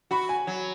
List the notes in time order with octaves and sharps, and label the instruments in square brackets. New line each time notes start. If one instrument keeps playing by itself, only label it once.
[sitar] F#4 [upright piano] B5
[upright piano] G#5
[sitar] F#3